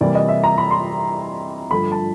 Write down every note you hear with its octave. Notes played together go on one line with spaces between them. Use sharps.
C3 E3 G3 A#3 D5
D#5
E5
A#5
B5
C6
G2 D3 F3 A3 B5
A5